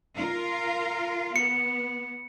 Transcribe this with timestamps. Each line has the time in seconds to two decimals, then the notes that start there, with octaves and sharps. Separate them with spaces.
0.15 F4 A#4 F5
1.36 B3 C#7